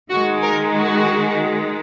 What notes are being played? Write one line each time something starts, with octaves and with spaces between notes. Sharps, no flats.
D#3 G#3 F#4
A#4
F#4